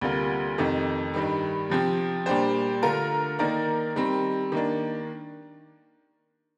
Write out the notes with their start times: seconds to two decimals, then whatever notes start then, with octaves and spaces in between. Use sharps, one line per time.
0.01 D2 C3 G3 A#3 F4
0.58 F2 C3 D#3 A3
1.14 G2 D#3 G3
1.70 C3 F3 C4 G4
2.26 A#2 G3 D4 G4 C5
2.83 D3 A3 D4 F4 A#4
3.39 D#3 A#3 D#4 A#4 D5
3.96 D#3 G3 C4
4.52 D#3 A#3 D4